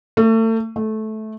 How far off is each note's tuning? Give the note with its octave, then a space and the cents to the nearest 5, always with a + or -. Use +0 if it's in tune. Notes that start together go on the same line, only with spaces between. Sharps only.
A3 +35
A3 -15